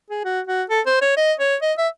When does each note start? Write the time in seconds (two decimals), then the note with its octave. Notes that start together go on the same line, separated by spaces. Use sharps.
0.10 G#4
0.24 F#4
0.47 F#4
0.70 A4
0.86 C5
1.01 C#5
1.17 D#5
1.40 C#5
1.62 D#5
1.77 E5